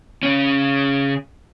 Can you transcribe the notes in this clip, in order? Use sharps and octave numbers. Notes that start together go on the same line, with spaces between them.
C#3 C#4